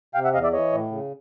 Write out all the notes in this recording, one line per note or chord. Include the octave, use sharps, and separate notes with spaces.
C3 F5 G5
E5 F#5
E2 D#5 F5
D5 E5
E3 C#5 D#5
A2
C#3